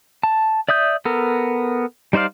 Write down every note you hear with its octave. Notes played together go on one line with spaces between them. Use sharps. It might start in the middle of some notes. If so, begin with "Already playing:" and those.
A5
D5 E5 D#6 G6
B3 A4 A#4
G3 D#4 C5 D5 F5